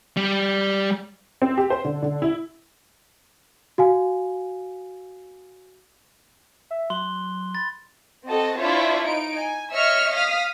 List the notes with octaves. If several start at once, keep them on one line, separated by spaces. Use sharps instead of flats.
G3
C4
G4
C5
D3
D3
E4
F#4 F5 G#5
E5
F#3 C6 F#6 G7
B5 A6
C4 F#4 A4 D#5 A5
D4 E4 F4 C5 C#5 E5
D#4 D7
G#5
C#5 D#5 E5 E6 F6 C#7
F5 D#6 F6 B6